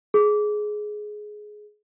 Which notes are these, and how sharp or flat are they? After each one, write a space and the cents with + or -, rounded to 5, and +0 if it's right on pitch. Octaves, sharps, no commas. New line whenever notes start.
G#4 +15